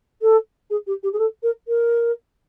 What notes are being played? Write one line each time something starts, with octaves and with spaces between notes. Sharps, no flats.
A4
G#4
G4
G4
G#4
A4
A#4
A#4